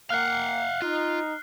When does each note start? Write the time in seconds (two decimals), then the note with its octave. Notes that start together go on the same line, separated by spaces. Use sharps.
0.10 A#3 F5 F#5 F6 F#6 C7
0.82 D#4 F4